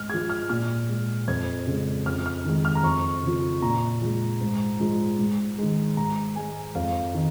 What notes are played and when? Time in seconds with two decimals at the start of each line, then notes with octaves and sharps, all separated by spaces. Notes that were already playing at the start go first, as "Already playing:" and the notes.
Already playing: G#2 F6
0.10 F3 G#3 G#6
0.29 F6
0.49 A#2 F6
0.88 G#3
1.28 F2 G#6
1.67 C#3 G#3
2.06 F2 F6
2.26 F6
2.45 D#3 G#3
2.65 F6
2.75 A#5
2.83 F2 C#6
3.23 C#3 F3
3.62 A#2 A#5
4.02 F3 G#3
4.41 G#2
4.80 F3 G#3
5.19 G#2
5.58 D#3 G#3
5.97 G#2 A#5
6.36 G#3 G#5
6.75 F2 F5
7.14 D#3